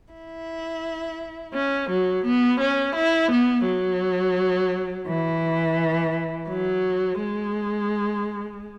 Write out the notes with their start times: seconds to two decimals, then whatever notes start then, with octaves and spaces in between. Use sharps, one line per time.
0.13 E4
1.53 C#4
1.89 F#3
2.25 B3
2.60 C#4
2.96 E4
3.31 B3
3.65 F#3
5.07 E3
6.49 F#3
7.19 G#3